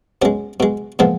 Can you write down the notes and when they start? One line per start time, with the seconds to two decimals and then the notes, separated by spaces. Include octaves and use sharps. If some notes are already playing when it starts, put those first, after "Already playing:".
0.22 B2 G#3 C#4
0.60 B2 G#3
0.99 A#2 F3 G#3 B3